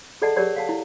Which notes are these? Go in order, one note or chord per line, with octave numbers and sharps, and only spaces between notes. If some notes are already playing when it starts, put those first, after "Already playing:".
G#4 A4 D5 D#5 F#5 A5
G4 G#4 A#4 C#5 D5 F#5
F5 F#5 A5
E4